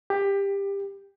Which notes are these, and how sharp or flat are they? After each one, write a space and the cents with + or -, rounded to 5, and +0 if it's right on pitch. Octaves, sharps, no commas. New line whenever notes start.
G4 +20